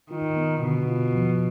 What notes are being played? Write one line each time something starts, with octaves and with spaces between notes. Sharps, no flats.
D#3 F4
B3
B2 D3
F4
F3